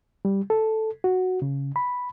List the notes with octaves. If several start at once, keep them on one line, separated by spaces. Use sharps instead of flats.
G3
A4
F#4
C#3
B5